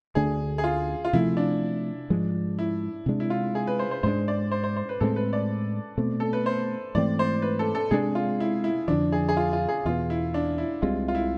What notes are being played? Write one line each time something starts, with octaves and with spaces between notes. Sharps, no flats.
D2 D3 A3 D4 G#4
G#4
F4
F4
C3 F3 A3 E4
D4
G#2 F3 G#3
E4
C3 G#3 D4
E4
F4
G#4
B4
C5
C5
G#2 G#3 D4 C5
D5
C5
C5
C5
B4
A2 G#3 C4 A4
B4
D5
B2 A3 C4
A4
B4
C5
G#2 E3 A3 C4 D5
C5
B4
A4
A4
C3 G#3 D4 G#4
F4
E4
E4
F2 D3 F3 D4
G#4
G#4
F4
F4
G#4
E2 B2 B3 F4
E4
D4
E4
C2 C3 G#3 F4
F4
E4